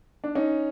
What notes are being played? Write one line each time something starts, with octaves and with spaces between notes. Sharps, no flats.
D4
C#4 D#4